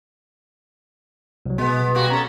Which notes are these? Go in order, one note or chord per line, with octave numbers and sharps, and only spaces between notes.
C2 F#3
B2 G#3 B3
G3 A#3 F#4
C#4 A4 A#5